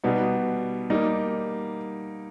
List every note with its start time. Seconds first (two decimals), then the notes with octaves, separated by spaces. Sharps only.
0.04 B2 G3 B3 D#4
0.90 G3 A#3 D#4